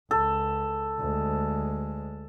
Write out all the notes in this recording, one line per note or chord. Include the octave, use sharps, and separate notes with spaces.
C#2 A4
D2 G#3